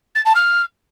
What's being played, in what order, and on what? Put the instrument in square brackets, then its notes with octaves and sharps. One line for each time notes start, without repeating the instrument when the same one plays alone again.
[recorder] A6
A5
F6